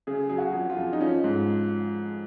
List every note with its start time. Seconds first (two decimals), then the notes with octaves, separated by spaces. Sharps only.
0.07 C#3 G#4
0.29 F#3 G#4
0.38 F#4
0.54 F2
0.70 F4
0.77 F2
0.93 D#4
1.01 F3 C#4
1.24 G#2